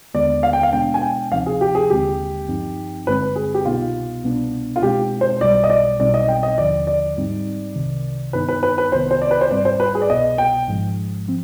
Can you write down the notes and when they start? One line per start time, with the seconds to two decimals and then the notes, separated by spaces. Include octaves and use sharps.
0.14 D#2 D3 G#3 B3 D5
0.43 F5
0.53 G5
0.63 F5
0.72 B2 G#3 B3 D4 G5
0.94 G#5
1.02 G5
1.31 D2 C3 F3 C4 D#4 F5
1.46 G#4
1.61 G4
1.75 G#4
1.90 D#2 D3 G#3 C4 G4
2.48 G2 F3 C4 D#4
3.07 G1 G2 D3 G#3 C4 B4
3.36 G#4
3.54 G4
3.65 C2 B2 B3 D#4 F4
4.23 C2 B2 B3 D4
4.76 F4
4.82 B2 G#3 C4 D#4 G4
5.21 C5
5.41 B1 B2 G3 D5
5.64 D#5
5.70 D5
5.99 B1 B2 G3 C4 D#4 D5
6.14 D#5
6.28 G5
6.43 D#5
6.58 D#2 D3 F3 D5
6.87 D5
7.16 G#2 G3 C4 D#4
7.76 C2 C3 D#3
8.33 G2 D#3 B3 D#4 B4
8.49 B4
8.63 B4
8.78 B4
8.92 C2 C3 D#3 B3 C5
9.11 C5
9.22 D5
9.31 B4
9.41 C5
9.50 G#1 G#2 G3 C4 D5
9.65 C5
9.80 B4
9.95 G#4
10.02 D5
10.09 C2 B2 B3 D#5
10.38 G5
10.68 G#1 G#2 F3 G#3
11.28 F3 C4